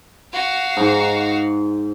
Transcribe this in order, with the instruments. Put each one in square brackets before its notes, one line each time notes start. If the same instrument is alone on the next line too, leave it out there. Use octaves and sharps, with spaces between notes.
[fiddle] F#4 F5
[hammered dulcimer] G#2